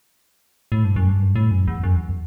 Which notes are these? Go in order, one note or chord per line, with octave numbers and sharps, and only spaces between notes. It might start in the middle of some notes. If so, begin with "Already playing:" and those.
A2
G2
F#2
G2
A2
F#2
E2
F#2
E2